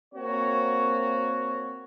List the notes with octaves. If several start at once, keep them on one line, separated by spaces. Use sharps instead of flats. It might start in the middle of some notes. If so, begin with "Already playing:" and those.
A#3 C4 F#4 C#5